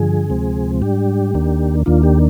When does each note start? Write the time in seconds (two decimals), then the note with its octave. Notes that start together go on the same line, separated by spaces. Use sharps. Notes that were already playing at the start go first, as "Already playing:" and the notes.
Already playing: G2 D3 F3 G#4
0.30 D2 C3 F3 G#3 C4
0.82 G#2 G3 D4 G4
1.34 D#2 D#3 A#3 D4
1.86 D#2 D#3 A#3 D4 F4
2.03 G4